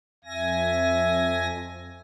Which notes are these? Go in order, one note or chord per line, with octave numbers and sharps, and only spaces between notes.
F2 E5 G#5 A#6